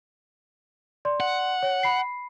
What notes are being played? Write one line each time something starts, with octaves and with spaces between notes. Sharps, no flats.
D5 C6
F#5
C#5
B5 C7